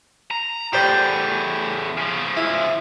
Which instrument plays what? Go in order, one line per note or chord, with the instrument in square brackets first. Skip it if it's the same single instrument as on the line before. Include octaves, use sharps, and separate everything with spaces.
[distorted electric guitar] A#5
[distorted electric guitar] E2 A2 [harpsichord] G4 C5 D5
[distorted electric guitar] C#3 F3
[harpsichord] E4